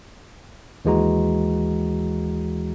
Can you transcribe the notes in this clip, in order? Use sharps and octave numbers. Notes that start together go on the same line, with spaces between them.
D#2 E3 G#3 F#4 A#5